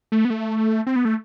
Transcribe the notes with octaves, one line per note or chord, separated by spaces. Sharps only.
A3
B3
A3
C4
B3
A3